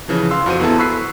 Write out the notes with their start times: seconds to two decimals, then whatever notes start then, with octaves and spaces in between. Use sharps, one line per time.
0.08 C#3 E3 F3
0.31 F5 C6 E6
0.46 F2 F#4 C5 D#7
0.60 E2 B3 E4 A4
0.79 B5 C#6 E6 F#6 B6 C7